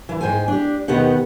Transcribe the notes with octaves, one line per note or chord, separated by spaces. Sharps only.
E3 E4
G#2 C#3 C5 G5 G#5
D4 G4
D#2 B2 D#3 B3 G4 F#5